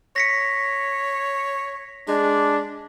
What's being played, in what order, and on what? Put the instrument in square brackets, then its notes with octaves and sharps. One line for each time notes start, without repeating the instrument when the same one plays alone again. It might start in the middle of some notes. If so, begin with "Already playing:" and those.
[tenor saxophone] C#5 [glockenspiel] A#6 B6 C#7
[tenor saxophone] G#3 [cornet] D4